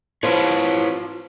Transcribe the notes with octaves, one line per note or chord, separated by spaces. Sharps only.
F3 E4 B4 C#5